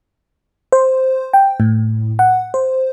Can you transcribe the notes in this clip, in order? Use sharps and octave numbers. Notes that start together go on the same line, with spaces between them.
C5
G5
A2
F#5
C5